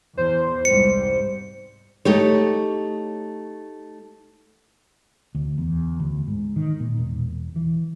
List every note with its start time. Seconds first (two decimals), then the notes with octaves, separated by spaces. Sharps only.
0.17 E2 C5
0.65 C2 G#2 G3 C#7
2.05 A3 D#4 G4 C#5
5.35 D2
5.58 E2
6.00 D2
6.27 G#2
6.56 D#3
6.80 A#2
6.97 E1
7.56 E3